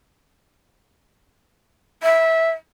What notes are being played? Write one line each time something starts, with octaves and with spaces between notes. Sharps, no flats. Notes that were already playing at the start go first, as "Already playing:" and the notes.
E5